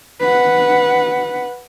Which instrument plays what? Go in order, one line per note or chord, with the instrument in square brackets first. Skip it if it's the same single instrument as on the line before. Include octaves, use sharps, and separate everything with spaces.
[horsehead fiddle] B4 F#5